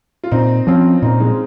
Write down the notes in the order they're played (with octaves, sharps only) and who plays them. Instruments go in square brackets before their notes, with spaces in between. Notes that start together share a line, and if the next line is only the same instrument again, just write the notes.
[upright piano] F4
[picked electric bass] A#2 [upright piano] C4 D#4
[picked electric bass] F3 C4 [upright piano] C#4 F4
[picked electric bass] A#2 [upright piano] C4 D#4
[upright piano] G#3 C4